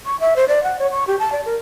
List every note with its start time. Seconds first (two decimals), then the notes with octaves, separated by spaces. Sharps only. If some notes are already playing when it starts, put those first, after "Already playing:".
0.06 C#6
0.20 E5
0.36 C5
0.48 D5
0.63 F#5
0.79 C#5
0.92 C#6
1.07 G4
1.19 A5
1.32 D5
1.46 A#4